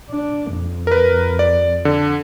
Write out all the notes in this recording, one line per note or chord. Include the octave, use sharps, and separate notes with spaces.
D4
F2
A#4 B4
D5
D3